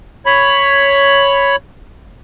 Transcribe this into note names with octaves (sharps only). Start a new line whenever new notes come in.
C#5 B5